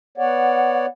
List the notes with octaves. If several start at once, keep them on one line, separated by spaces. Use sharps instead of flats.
B3 C#5 D5 F#5